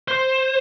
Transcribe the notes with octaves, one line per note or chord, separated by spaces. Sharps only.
C5